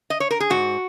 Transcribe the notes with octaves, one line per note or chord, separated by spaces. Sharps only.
D#5
C#5
A#4
G#4
G#2 F#4